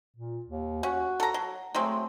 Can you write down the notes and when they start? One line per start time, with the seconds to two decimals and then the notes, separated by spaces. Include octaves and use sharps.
0.16 A#2
0.46 D#2
0.83 C#4 F#4
1.20 A4 A#5
1.34 F#3
1.75 F#3 G#3 A3 C4